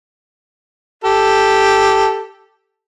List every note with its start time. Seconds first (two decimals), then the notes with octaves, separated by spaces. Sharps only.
1.04 G4 A4